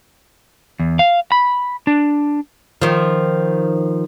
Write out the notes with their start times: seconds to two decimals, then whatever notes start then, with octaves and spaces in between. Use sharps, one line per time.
0.80 E2
0.99 F5
1.32 B5
1.87 D4
2.82 D#3 F3